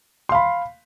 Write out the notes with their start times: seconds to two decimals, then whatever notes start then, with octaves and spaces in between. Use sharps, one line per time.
0.29 C6
0.32 F5
0.35 B5